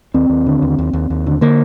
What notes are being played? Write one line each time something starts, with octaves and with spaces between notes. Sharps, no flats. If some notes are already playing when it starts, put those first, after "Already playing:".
D#2 C4
D#2
D3
D#2
D#2
D#2
D#2
D3
D3 A#3